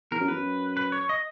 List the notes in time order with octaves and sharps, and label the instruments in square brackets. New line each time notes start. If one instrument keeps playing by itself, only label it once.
[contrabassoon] E2 [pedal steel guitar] A#4
[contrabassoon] F#2
[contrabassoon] E2 [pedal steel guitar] B4
[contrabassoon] F#2
[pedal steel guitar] B4
C#5
D#5